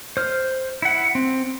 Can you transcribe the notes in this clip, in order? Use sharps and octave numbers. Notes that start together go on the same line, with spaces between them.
C5 F6
E4 F#5
C4